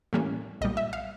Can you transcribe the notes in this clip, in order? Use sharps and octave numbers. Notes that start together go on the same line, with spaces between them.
A2 E3 G3 A#3 C#4
B1 A#2 G3 D#5
E5
F5